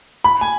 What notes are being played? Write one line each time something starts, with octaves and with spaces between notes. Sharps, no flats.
B5
G#5